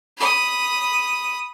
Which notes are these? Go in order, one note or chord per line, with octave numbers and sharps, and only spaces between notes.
B5 D#6